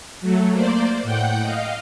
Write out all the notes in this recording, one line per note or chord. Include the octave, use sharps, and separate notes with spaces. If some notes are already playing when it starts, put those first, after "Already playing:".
F#3 A3
A#3 C5 D5
A2 F#5 G5 G6
D#5 F5